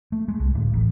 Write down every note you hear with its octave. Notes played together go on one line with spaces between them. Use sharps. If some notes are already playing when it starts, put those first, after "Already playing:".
A3
G#3
C2
D1
A1